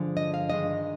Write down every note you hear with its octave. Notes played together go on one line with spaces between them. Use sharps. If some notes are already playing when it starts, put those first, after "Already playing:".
Already playing: G2 D3 F3 G#3
D#5
F5
G2 D#3 G#3 D#5